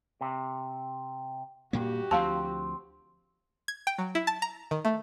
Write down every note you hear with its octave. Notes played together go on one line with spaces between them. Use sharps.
C3
G2 A#2 A#3 F#4 G4
D2 F3 C4 F5 A5
G#6
G5
F#3
E4
A5
A#5
D#3
A3